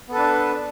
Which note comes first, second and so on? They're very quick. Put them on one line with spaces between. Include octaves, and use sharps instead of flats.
B3 A4 B4 D4